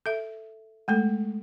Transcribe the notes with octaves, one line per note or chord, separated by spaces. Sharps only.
A4 E5
G#3 A3 A4